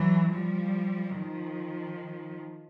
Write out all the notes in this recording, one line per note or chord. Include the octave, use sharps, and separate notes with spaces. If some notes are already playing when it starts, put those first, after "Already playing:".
Already playing: E3 F#3
F3 G3
D#3 F3